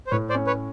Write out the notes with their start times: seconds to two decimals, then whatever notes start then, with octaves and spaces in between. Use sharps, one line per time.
0.07 C5
0.11 A2 B4 C#5
0.30 C5 D5
0.35 C#4
0.47 B4 C#5